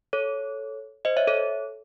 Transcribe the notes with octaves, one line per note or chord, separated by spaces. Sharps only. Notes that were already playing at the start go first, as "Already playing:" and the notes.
A4 C#5
C5 D#5
C#5 E5
A4 C#5